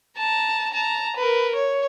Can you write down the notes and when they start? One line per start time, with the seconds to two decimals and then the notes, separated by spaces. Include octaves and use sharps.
0.18 A5 A#5
0.73 A5 A#5
1.16 A#4 B4
1.55 C#5